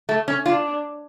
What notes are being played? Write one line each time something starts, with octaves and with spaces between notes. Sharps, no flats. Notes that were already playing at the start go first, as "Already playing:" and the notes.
A3
C#4
D4 F4